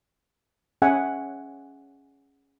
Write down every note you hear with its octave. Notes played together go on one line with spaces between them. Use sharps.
C#4 G#4 E5 F#5 G#5